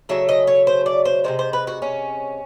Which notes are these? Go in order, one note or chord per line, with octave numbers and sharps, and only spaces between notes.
C#3 F#3 A3 E5
D#5
C#5
C5
D5
C5
C3 D#3 G#3 C5
C5
B4
F#4
C#4